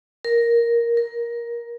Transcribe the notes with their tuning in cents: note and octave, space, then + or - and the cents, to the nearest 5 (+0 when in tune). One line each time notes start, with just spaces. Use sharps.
A#4 +5
A#4 +15